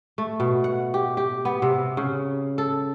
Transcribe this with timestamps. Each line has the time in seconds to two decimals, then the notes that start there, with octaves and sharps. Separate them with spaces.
0.18 A3
0.40 B2
0.64 F#5
0.94 G4
1.17 G4
1.45 B3
1.62 C3
1.97 C#3
2.58 A4